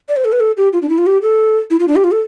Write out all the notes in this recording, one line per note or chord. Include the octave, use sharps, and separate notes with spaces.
D5
C5
A4
B4
A4
G4
F4
D4
E4
F4
G4
A4
E4
F4
D4
G4
F4
A4